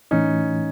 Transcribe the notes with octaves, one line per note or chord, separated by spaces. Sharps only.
A2 E3 A3 C#4 D#4